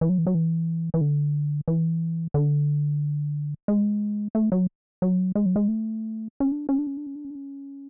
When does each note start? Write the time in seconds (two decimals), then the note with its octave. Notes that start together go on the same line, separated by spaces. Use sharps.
0.01 E3
0.09 F#3
0.18 E3
0.27 F#3
0.35 E3
0.94 E3
1.01 D3
1.68 E3
2.34 D3
3.68 G#3
4.35 A3
4.52 F#3
5.02 F#3
5.35 G#3
5.46 F#3
5.56 G#3
5.68 A3
6.40 C#4
6.52 D4
6.69 C#4
6.79 D4
6.87 C#4
6.97 D4
7.06 C#4
7.15 D4
7.25 C#4
7.30 D4
7.35 C#4